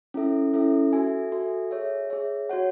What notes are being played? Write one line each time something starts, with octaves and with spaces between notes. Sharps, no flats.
C#4 E4 A4 E5
C#4 E4 A4 E5
F#4 A4 E5 G#5
F#4 A4 E5 G#5
G#4 C#5 E5
G#4 C#5 E5
F#4 C#5 F#5